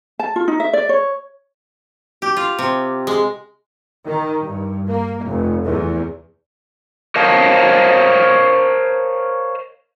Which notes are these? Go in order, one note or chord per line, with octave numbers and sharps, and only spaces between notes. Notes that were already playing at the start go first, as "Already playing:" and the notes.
A5
F4
D#4
E5
D5
C#5
G4
F4
C3
G#3
D#3
G2
A#3
F1
E2
A#4 C5 C#5 D#5 F5 A5